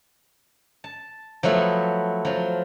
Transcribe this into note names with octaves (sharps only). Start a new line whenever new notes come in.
A5
F3 F#3 A3 B3 E4
F3 F#3